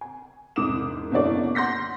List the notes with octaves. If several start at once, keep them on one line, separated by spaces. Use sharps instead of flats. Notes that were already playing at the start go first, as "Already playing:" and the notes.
G#5
E1 C2 G#2 D6 D#6 E7
F#1 B2 D3 E4 C#5 D5
F#5 C6 G6 A#6 B6